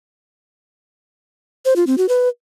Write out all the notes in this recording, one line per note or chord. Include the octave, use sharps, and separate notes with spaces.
C5
F4
C4
F#4
B4